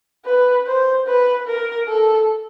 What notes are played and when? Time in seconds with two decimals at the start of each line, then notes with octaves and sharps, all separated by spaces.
0.25 B4
0.66 C5
1.06 B4
1.47 A#4
1.88 A4